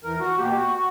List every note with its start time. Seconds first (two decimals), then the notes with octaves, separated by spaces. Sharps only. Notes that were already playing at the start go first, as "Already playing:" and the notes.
0.03 E2 A#4
0.20 F#4
0.38 B2 A#3 G4
0.55 F#4